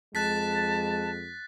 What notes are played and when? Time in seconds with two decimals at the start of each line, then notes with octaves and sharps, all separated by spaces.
0.15 F2 G#3 A5 F#6 A6 B6